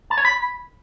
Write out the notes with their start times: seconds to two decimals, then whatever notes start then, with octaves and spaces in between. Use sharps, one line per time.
0.10 A5
0.18 C#5
0.25 B5